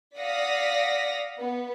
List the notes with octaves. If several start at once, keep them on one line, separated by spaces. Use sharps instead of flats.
D5 F5 F#5 D#6 A#6 B6
B3 B4